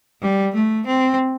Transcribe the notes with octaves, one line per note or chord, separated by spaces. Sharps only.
G3
A3
C4